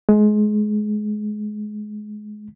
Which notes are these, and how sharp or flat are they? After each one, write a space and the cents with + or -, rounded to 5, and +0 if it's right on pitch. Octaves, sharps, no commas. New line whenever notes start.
G#3 +25